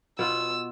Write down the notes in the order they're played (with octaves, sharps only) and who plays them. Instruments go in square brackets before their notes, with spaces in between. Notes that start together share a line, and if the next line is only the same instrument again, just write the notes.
[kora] B2 B3 F4 [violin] E6